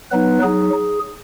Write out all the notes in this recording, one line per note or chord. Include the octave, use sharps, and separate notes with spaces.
F#3 B3 D#4 B4
F#3 D#4 G#4